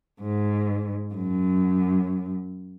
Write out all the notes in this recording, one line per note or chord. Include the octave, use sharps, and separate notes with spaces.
G#2
F#2